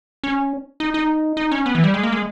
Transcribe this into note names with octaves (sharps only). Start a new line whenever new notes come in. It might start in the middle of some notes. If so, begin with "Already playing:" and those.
C#4
D#4
D#4
D#4
C#4
B3
E3
G3
G#3
A#3
G#3